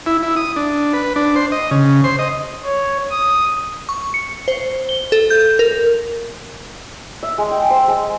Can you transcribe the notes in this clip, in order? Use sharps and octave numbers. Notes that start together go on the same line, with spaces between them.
E4
E4
D#6
D4
B4
D4
C5
D#5
C#3
C5
D#5
C#5
D#6
C#6
C#7
C5
G7
A4
G6
A#4
E5
G#3
G5
C5
G#3